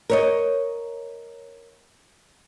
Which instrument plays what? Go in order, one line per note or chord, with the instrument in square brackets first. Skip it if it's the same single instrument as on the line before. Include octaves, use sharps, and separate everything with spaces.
[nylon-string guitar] A#4 C#5 D#5